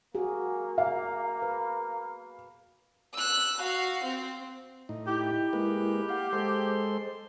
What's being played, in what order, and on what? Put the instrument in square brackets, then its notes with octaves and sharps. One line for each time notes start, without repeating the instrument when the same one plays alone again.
[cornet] A#3 [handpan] F#4 G#4
[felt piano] F5
[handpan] B4
[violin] E6 F#6
F#4 F5
C4
[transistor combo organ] A2 D#4
[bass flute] E4 [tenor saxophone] G4
[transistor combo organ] G#3 A#3 B4
[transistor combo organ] F5 [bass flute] F#5
[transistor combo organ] G#3 A4 C6 [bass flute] C5